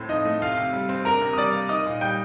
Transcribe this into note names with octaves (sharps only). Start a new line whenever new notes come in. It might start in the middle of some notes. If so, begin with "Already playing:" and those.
Already playing: A2 C4
F3 D#4 D#5
A3
C3 F4 F5
C3
G3
C4
D4 A#4 A#5
C3
D#6
G3 D5 D6
A#3
D#4 D#5 D#6
A#2
G3 G5 G6